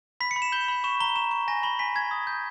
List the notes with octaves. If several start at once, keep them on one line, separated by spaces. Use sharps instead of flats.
B5 B6
C#7
B5
E7
G6 G7
B5
C#6 E7
A#5 G7
C#6 E7
C#6
G#5 A#6
B5 G7
G#5 B6
G#5 G#6
D#6
G6